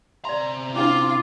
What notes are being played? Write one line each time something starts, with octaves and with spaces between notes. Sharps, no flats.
C3 D5 A#5 C6
C#4 D4 E4 F4 D6